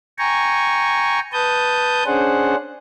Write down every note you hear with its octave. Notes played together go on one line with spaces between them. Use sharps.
G5 G#5 A#5 C#6
B4 A5 D#6 G6
C#4 D4 G#4 C5 F#5